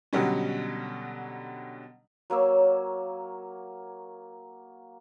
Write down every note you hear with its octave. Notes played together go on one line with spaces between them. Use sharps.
B2 D3 F#3 G3 C#4
F#3 A#3 C#5 E6